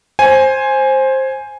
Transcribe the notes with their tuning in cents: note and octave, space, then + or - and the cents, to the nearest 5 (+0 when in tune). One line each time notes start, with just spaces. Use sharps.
C5 +15 G#5 +0